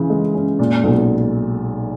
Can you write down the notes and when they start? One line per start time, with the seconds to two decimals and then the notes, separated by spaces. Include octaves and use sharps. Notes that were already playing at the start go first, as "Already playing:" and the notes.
Already playing: C#3 E3
0.10 G#3
0.35 C#4
0.59 A#2
0.84 B1